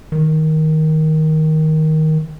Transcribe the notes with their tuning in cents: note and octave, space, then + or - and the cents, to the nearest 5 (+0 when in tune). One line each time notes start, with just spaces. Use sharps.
D#3 +10